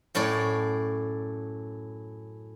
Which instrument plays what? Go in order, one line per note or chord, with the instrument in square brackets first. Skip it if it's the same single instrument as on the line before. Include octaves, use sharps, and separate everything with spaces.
[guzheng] F#2 A2 C#5 D5